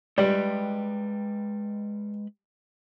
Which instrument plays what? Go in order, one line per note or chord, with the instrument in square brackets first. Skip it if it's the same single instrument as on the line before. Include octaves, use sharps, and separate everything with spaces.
[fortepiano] G3 [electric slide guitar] G#3 B4 G5